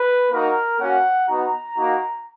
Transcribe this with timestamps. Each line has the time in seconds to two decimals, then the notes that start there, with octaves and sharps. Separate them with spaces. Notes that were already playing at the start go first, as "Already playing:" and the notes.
Already playing: B4
0.31 A#3 D#4 F#4 A#4
0.79 A#3 C#4 F#4 F#5
1.27 B3 D#4 F#4 A#5
1.77 A#3 D#4 F#4